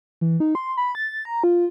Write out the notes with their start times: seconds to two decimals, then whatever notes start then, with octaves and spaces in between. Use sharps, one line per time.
0.21 E3
0.40 D#4
0.55 C6
0.77 B5
0.95 A6
1.25 A#5
1.44 F4